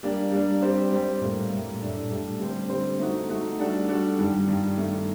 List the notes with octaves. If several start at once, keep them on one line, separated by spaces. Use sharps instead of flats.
G3 A#3 D4
G3 A#3 D4
G3 C4 G4 C5
G3 C4 G4 C5
A2 G3 A#3
A2 G3 A#3
A2 G3 D4 A4
A2 G3 D4 A4
D3 G3 C4 G4 C5
D3 G3 C4 G4 C5
A3 D#4 F#4
A3 D#4 F#4
G3 D4 F#4 A4
G3 D4 F#4 A4
G2 D#3 G3
G2 D#3 G3
G2 D#3 A3